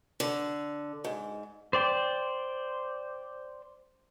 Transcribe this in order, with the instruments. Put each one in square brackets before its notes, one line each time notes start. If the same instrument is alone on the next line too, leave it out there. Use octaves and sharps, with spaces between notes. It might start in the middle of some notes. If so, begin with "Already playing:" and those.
[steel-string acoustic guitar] D3
G#2
[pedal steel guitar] C5 D5 G5